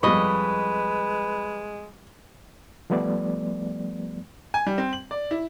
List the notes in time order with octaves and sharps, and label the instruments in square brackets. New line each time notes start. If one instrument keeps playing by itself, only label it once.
[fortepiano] F2 G3 B5 [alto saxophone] G#3 [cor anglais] B4 [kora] C#5 D#5
[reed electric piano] F3 G3 A3 B3 D5
[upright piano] G#5
G3
C4
F#7
D5
E4